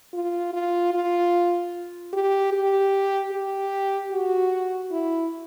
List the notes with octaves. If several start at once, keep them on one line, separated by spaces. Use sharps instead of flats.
F4
F4
F4
G4
G4
G4
F#4
E4